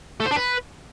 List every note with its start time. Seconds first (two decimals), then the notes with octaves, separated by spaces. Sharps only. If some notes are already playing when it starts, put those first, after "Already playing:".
0.20 A3
0.26 C5
0.31 D4
0.36 B4